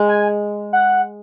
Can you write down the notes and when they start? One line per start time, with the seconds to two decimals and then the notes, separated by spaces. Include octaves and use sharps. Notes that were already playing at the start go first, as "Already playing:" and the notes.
Already playing: G#3
0.09 G#5
0.73 F#5